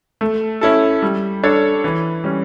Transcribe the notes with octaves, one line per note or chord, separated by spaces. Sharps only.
A3
C#4 E4 A4
G3
D4 A4 C#5
E3
G3 C#4